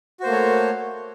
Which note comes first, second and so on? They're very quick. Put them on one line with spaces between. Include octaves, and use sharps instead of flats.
F#4 C5 A#3 A3 C#5